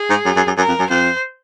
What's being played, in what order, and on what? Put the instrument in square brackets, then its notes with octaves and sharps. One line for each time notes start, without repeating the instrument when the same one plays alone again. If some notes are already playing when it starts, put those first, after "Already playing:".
Already playing: [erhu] G#4
[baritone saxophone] G#2
F#2
F#2
F#2
[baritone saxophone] F#2 [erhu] A#4
[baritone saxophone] F2
F#2
[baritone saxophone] F2 [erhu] C5